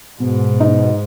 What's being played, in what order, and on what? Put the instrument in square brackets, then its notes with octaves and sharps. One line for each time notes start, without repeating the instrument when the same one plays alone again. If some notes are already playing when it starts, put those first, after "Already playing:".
[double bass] G#2 [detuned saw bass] B2
[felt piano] D#4